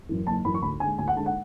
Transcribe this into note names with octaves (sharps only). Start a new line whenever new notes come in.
F#2 E3
F#1 A5
F#2 E3 B5
C#6
D2 B5
D3 G#3 G#5
D2 G#5
F#5
D3 G#3 A5
F#5